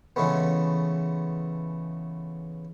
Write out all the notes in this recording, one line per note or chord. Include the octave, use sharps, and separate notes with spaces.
C#3 E3 G#3 A3 B3